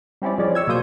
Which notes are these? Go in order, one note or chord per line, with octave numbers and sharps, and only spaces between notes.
G3 C4 C#4 E4 D5
F3 G#3 C#4 D5
C#6 E6 G#6
B2 F#3 A#3 C5 D#6 G6